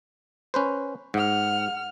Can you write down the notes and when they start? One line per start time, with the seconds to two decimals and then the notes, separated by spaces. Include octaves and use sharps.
0.54 C#4 B4 C5
1.14 G#2 F#5 F6